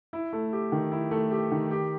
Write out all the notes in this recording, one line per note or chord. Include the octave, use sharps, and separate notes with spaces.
E4
A3
G4
D#3
E4
A3
G4
D#3
G4